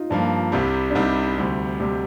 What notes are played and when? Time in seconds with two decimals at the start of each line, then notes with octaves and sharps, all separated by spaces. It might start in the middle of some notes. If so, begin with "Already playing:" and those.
Already playing: D#4 F4
0.10 G2 F3 A#3 D4
0.52 C2 C3 G3
0.90 D4
0.95 C2 C3 G3 D#4
1.37 D2 C3 G3
1.80 D2 C3 G3